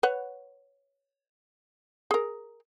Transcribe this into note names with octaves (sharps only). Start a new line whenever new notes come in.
B4 C#5 F#5
G#4 A#4